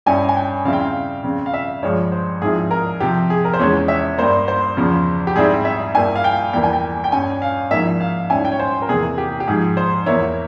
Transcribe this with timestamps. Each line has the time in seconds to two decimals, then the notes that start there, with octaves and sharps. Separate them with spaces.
0.06 G2 G3 C#4 E4 G#5
0.29 G#5
0.36 G5
0.65 C#3 G3 C4 E4 F5
0.73 G5
0.81 F5
1.24 C#3 G3 C4
1.46 F5
1.54 E5
1.83 G2 F3 G#3 C#5
2.12 C5
2.41 G#2 F3 C4 E4 G#4
2.71 A#4
3.00 C3 F3 C4 G4
3.30 G#4
3.45 A#4
3.53 C5
3.59 E2 E3 G#3 C#4 C#5
3.88 E5
4.18 G2 G3 A#3 C5
4.48 C5
4.77 E2 C#3 F3
5.27 G4
5.36 G#2 G3 C4 E4 G#4
5.65 E5
5.94 G2 G3 A#3 E4 G#5
6.16 F5
6.24 G5
6.53 E2 E3 G3 A#3 G5
6.63 G#5
6.73 G5
7.04 G5
7.12 G2 G3 C#4 G#5
7.42 F5
7.71 G#2 F3 A#3 E4 E5
8.01 F5
8.30 G#2 G3 C#4 E4 G#5
8.45 G5
8.52 C#5
8.59 C5
8.82 A#4
8.89 E2 C3 E3 A#3 G#4
9.18 G4
9.40 G4
9.47 G#2 F3 G#3 G#4
9.77 C5
10.06 E2 E3 A#3 E4 C#5